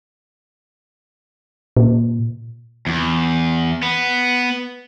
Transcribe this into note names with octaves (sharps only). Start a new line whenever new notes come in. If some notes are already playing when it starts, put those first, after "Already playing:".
A#2
E2
B3